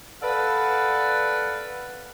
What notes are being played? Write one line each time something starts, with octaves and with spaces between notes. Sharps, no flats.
A4 B4 D5 F5 F#5